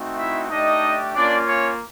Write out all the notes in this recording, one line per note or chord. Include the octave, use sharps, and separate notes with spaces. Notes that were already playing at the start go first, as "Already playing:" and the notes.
Already playing: A3 C4 D#4 F#4
E4 E5
A3 D4 D#4 G4 D#5
A#3 C#4 D4 F4 D5
C#4 C#5